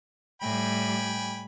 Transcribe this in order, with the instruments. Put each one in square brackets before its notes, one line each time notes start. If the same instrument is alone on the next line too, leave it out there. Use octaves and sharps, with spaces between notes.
[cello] A2 G3 [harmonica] G5 G#5 B5